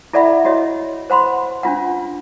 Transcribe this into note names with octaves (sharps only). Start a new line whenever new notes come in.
E4 A4 D5 E5 F#5 B5
E4 F#4 C#5 D#5
C5 F#5 B5 C6
C#4 D4 F4 F#5